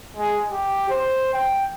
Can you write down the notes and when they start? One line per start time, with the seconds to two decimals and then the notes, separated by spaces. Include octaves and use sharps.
0.16 G#3
0.51 G4
0.90 C5
1.34 G5